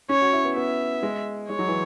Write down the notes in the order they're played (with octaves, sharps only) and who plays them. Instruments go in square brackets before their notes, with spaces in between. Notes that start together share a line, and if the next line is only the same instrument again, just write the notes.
[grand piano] C#4 [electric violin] C#5
[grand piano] F#4
E4
B3
[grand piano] B3 [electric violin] E5
[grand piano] G#3
[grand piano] G#3 [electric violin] C#5
[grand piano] F#3
E3